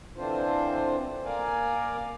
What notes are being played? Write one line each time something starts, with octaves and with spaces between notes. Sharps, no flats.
D3 E3 C4 D4 F4 C5
A#3 A#4 D5 F5 G#5